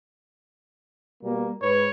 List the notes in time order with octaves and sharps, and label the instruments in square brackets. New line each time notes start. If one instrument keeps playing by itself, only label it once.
[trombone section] B2 G3 A#3
[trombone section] G#2 B4 [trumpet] C#5